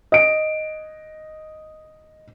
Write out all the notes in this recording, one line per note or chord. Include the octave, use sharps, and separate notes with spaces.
D#5 D7